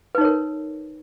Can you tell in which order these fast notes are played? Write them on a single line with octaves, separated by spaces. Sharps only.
B4 D#4 C#5 A#4